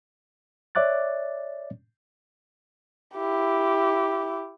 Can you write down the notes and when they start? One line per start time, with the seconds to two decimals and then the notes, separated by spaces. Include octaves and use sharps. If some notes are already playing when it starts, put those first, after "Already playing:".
0.75 C#5 D5 E5 D6 F#6 A6
3.16 E4 G4